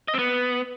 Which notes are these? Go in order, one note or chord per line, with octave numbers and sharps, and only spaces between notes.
D#5
C4
B3